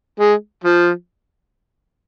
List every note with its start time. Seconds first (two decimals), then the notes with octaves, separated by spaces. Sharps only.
0.20 G#3
0.64 F3